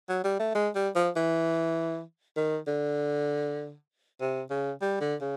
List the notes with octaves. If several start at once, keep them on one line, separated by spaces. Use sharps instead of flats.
F#3
G3
A3
G#3
G3
F3
E3
D#3
D3
C3
C#3
G3
D3
C#3